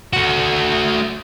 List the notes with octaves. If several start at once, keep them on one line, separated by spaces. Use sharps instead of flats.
A3 F#4